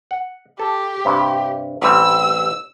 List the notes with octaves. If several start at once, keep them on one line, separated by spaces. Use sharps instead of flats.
F#5
G4 A4
G2 C3
A1 G3 C4 E6